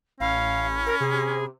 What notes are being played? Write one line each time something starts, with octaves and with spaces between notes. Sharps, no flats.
A1 C#4 F5 B5
A#4
C3 G#4